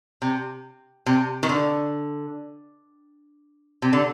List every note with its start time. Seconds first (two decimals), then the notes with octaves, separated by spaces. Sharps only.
0.22 C3
1.06 C3
1.43 D#3
1.49 D3
3.82 C3
3.93 D3